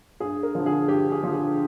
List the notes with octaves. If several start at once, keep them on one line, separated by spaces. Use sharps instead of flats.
G2 G#4
A#4
D3 F3
G#4
G2 G4
G#4
D3 F3
G#4